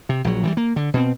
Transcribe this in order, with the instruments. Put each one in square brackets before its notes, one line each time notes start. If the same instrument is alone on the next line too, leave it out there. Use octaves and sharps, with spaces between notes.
[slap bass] C3
A#1 F#3
E3 F#3 G3
A#3
D3
B2 C4